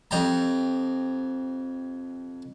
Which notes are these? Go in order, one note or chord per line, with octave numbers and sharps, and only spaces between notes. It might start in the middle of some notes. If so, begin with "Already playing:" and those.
F2 G4 A#5